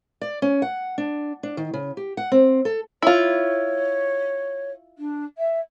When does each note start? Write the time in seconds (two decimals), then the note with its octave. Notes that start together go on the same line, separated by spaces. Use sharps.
0.21 D5
0.42 C#4
0.62 F#5
0.98 D4
1.43 D4
1.57 D#3
1.74 C#3
1.97 G4
2.17 F#5
2.32 C4
2.65 A4
3.02 E4 F4 C#5
4.98 D4
5.37 E5